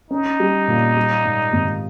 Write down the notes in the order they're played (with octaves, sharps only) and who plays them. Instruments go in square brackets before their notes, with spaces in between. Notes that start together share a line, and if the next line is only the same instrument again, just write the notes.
[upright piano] C#4 [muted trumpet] D#4
[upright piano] G3
A#2
G3
G#2
G#1